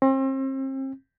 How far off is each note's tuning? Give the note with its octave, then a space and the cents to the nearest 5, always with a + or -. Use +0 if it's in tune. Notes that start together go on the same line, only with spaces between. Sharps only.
C4 +40